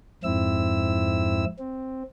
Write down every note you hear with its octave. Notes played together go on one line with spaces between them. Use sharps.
F2 G#2 C4 E4 E6
C4